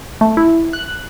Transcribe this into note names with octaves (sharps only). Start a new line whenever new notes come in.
A3
E4
F#6